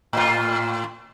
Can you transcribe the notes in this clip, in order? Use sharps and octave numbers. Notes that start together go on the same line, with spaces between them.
A2 F4